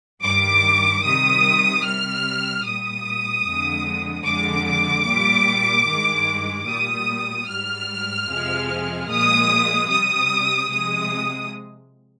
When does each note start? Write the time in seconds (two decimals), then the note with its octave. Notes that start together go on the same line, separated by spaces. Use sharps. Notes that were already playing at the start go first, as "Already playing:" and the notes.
0.23 G2 D#3 G3 D6
1.03 C3 D#3 G3 D#6
1.84 C3 G3 F6
2.65 A#2 G3 D#6
3.46 F2 D3 G#3
4.25 F2 D3 G#3 D6
5.06 A#2 G3
5.87 G2 D#3 G#3
6.67 A#2 G3 D#6
7.48 G#2 G3 F6
8.28 F2 C3 F3 G#3
9.09 A#2 F3 G#3 D#6
9.88 C3 G3 D#6
10.69 C3 F3 G#3 D#6